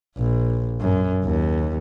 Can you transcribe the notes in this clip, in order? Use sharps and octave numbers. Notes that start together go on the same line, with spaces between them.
A#1
F#2
D#2